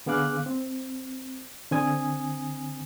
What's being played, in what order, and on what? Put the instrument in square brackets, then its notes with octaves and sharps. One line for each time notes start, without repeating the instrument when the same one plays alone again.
[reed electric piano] D3 B3 G#4 F5 D6 F#6
C4
D3 C4 G#5 D#6